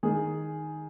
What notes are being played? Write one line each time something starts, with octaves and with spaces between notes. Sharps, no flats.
D#3 G#4